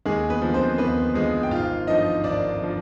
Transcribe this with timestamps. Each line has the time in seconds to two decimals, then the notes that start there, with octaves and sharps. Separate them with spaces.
0.06 D#2 G#3 G#4
0.30 B3 B4
0.42 D3 F3
0.54 C4 C5
0.78 D#2 B3 B4
1.14 D3 F3 G#3 G#4
1.43 G5
1.51 G#1 F4 F5
1.87 G2 D3 F3 D#4 D#5
2.24 G#1 D4 D5
2.62 D3 F3